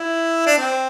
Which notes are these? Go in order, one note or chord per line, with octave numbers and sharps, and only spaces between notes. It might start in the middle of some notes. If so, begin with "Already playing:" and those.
Already playing: E4
D4
C4